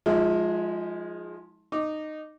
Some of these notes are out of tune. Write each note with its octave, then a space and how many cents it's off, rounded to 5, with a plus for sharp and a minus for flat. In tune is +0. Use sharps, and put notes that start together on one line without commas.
F3 +15 G#3 +0 E4 -40
D#4 -15 D6 +0